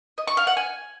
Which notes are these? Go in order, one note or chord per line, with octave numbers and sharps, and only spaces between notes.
D#5
C#6
F5
F#5
G#5